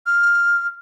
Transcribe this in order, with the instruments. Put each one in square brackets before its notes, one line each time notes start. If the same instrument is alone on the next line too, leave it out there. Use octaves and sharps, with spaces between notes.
[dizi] F6